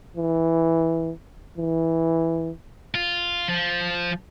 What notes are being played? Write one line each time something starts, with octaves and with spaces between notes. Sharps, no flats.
E3
E3
F4
F3